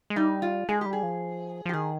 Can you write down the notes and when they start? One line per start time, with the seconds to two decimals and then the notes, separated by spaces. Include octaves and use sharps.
0.10 G#3
0.16 G3 D#4
0.42 F4
0.69 G#3 G#4
0.81 G3 G4
0.93 G#4
1.03 F3
1.66 F3
1.69 G4
1.73 D#3 G#4